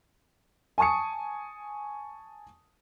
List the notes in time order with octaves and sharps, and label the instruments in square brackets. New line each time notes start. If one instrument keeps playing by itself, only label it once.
[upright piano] G#5 A5 C#6 D#6 C#7